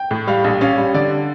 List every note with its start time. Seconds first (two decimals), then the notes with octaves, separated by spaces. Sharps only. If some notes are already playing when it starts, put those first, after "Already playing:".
Already playing: G5
0.11 A2
0.27 G3 F5
0.44 A#1
0.61 C#4 F5
0.78 G3
0.94 D3 D5